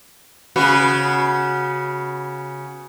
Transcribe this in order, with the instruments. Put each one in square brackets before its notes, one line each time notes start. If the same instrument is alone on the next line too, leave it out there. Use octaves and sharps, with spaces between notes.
[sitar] C#3 B3 F#4